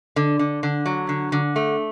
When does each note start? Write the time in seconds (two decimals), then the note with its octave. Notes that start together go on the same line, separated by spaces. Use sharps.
0.16 D3
0.39 D3
0.63 D3
0.86 F#3
1.09 D3
1.32 D3
1.56 A3